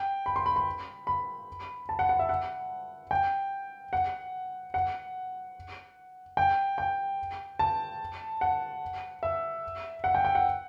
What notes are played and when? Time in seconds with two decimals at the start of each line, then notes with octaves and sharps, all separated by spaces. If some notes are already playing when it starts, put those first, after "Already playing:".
Already playing: G5
0.26 B5
0.36 C6
0.46 B5
0.56 B5
1.07 B5
1.89 A5
1.99 F#5
2.09 F#5
2.19 E5
2.29 F#5
3.11 G5
3.93 F#5
4.74 F#5
6.37 G5
6.78 G5
7.59 A5
8.41 F#5
9.23 E5
10.04 F#5
10.15 G5
10.25 G5
10.35 F#5